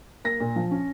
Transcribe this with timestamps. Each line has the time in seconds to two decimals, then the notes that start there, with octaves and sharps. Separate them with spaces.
0.24 A#3 A#6
0.40 A#2
0.56 F3
0.71 C#4